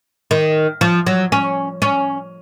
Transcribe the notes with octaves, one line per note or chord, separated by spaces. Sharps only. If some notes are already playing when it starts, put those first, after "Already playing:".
D#3
F3
F#3
C#4
C#4